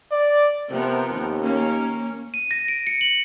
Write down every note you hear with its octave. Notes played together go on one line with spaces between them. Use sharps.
D5
C3 F3 B3 A#4
D#2
A#3 C#4
D#7
A#6
D7
C#7
F#7